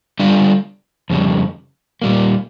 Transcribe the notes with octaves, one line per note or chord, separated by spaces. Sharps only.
D3 G3 D4 F4
F2 C#3 G3
A#2 G3 A#3